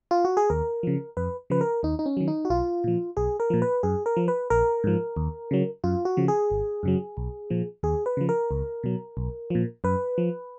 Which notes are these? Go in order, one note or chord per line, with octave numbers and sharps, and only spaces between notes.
F4
F#4
G#4
D#2 A#4
C#3 F3
F2 B4
C#3 F3 B4
A#4
D#2 D#4
D#4
C#4
D#3 F#3
D#4
F#4
B1 F4
A#2 F3
B1 G#4
A#4
A#2 F3
B4
F#2 G#4
A#4
F3
B4
A#1 A#4
G#2 F3
D#2
C#3 F#3
F#2 F4
F#4
C#3 F3
G#4
G#1
F#2 C#3 F#3
B1
A#2 F3
D#2 G#4
B4
C#3 F3
A#4
C#2
B2 F#3
B1
A#2 F3
F#2 B4
F3